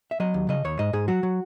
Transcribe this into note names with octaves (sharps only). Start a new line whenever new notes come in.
E5
F#3 D#5
D#2
C#3 D#5
D#2 C#5
G#2 D#5
G#2 G#4
F#3 F#4
F#3